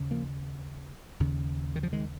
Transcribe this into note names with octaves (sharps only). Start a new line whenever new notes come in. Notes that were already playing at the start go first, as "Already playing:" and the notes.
Already playing: D#2 C#3
F3 A#3
D#2 C#3
D#3
F3
D#3 G#3